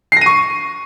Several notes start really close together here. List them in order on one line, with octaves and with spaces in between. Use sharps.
C7 A#6 D#7 C#6